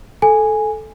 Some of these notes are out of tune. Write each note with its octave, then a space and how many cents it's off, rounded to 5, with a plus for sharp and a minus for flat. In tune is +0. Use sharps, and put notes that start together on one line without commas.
A4 -15 G#5 -5